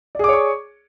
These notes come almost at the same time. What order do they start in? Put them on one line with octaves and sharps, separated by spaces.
D5 G#4 D6 C#5 C#6